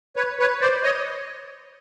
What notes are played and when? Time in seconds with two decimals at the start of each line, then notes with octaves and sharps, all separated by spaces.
0.16 B4 C#5
0.39 B4 C#5
0.61 C5 D5
0.83 C#5 D#5